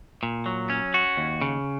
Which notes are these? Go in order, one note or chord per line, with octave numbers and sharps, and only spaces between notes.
A#2
F#3
C#4
F#4
D#2
C#3